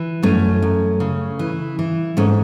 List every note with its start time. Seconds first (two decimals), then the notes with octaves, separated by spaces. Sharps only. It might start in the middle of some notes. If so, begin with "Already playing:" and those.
Already playing: E3
0.23 F#2 A3 C#4
0.62 F#2
1.00 C#3
1.39 E3
1.79 E3
2.17 G#2 A3 C#4